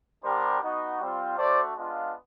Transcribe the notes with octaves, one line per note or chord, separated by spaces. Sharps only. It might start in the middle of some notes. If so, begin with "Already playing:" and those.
G3 B3 D4 G4 A#4 C5
B3 D#4 F#4
G3 C4 F4
A3 D4 F#4 C5 D5
G#3 B3 D4 F4